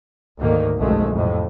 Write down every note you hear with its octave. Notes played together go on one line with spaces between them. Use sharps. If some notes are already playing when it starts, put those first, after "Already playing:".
D2 G#2 D#3 A#3
F#1 B1 F2 G#3 A3
F2 A2 C3